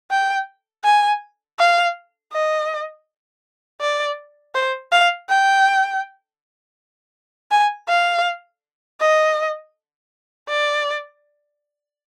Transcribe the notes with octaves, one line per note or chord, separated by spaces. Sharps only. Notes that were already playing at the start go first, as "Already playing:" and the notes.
G5
G#5
F5
D#5
D5
C5
F5
G5
G#5
F5
D#5
D5